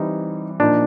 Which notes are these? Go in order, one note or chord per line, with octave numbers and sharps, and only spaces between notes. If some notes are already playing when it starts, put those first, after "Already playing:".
Already playing: E3 G3 C4 D#4
A#2 F3 A#3 D4 D#4